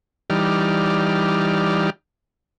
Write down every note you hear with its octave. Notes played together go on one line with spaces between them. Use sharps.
E3 G3 D#4 G4 D5 F6